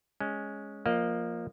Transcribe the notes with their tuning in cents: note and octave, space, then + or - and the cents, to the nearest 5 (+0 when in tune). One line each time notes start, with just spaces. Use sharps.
G#3 +0 C#4 +0
F3 +0 A#3 +0 D#5 -25